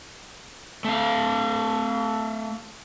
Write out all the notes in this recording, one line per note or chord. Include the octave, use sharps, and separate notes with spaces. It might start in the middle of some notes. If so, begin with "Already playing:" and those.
A3 F5